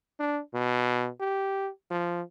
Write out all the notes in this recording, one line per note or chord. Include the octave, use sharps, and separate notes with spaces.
D4
B2
G4
F3